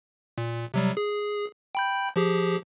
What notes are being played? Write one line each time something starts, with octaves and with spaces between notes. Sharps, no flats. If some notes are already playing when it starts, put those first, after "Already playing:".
A#2
C3 F#3 G3
G#4
G5 B5 G6
F3 G4 G#4